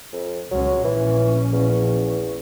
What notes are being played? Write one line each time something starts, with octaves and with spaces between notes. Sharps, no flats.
F2
C#2 F#3 G#3 C#4
A#1 E3 C#4
E2